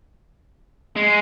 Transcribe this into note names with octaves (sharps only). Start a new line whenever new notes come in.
G#3